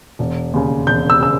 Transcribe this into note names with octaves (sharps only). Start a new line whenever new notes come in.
E1
D#2 C#3
E1 G6
E6
C#3 E6